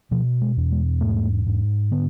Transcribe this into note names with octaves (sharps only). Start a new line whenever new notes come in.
B2 F3
G#3
E2
G#3
G#2 A3
G#2
D3 B3